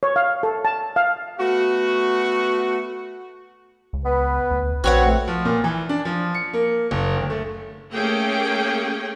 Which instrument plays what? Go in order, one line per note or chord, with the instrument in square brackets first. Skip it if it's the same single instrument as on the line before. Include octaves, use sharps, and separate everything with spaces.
[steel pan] C#5
F5
A4
A5
F5
[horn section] A3 B3 F#4
[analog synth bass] C#2
[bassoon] B3 [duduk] B4
[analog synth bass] D2
[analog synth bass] A#1 [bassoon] C4 [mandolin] F#4 C#5 F#5 [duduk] B4
[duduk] A3
[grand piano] F3
A#2
E3
D4
F3
C#7
A#3
F#1
D2
A3
[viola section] A3 A#3 C#4 G4 G#4 G5